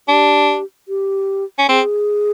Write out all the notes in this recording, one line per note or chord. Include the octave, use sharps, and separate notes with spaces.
D4 G4
G4
C#4
C4 G#4